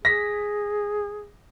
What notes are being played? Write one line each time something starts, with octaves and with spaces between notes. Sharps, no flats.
G#4 A#6 B6